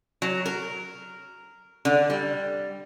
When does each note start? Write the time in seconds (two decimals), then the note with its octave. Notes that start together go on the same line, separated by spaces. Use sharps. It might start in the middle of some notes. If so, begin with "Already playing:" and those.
0.22 F#3
0.46 A#4
1.85 D3
2.10 G3